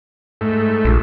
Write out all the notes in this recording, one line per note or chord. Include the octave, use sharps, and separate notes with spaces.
G#2 A3
A#1